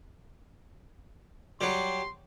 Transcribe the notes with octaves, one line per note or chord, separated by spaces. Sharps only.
F#3 G3 C6